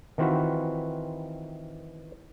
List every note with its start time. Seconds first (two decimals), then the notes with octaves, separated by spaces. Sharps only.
0.18 D#3 E3 C4 F4 F#4 B4